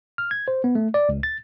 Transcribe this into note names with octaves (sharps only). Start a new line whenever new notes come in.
F6
G#6
C5
B3
A3
D5
C#2
A6